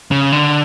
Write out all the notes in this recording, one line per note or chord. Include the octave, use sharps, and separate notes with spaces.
C#3
D3